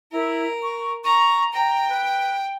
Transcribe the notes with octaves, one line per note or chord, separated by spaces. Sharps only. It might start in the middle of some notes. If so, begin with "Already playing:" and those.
E4 A#4
C#6
A#5 C#6
G5 A#5
B4